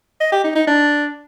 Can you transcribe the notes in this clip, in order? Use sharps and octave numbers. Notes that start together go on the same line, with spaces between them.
D#5
G4
D#4
D#4
D4